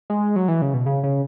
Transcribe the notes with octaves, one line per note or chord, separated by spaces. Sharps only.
G#3
F#3
E3
C#3
B2
C#3
C#3